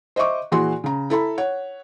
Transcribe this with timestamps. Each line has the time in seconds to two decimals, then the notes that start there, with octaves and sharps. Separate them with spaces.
0.16 C5 D#5 E5 C#6 D6
0.52 A#2 E3 F#4 G#4 C6
0.84 C#3 A#5
1.10 E4 A4 A#5 B5
1.38 C#5 F#5